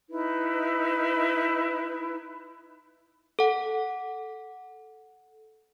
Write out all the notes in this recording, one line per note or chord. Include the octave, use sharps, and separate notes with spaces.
D#4 E4 B4
A4 F#5